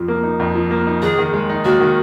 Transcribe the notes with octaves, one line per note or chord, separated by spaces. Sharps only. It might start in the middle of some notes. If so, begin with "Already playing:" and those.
Already playing: F2 F3
A#3
D#4
F2
F3
A#3
D#4
D#2 G#4
D#3
G#3
D#4
D#2 F#4
D#3